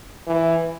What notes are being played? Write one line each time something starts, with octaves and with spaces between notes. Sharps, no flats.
E3